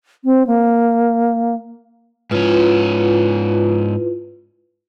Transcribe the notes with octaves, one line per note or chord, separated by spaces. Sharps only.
C4
A#3
G#2 C#4 E4 F4 B4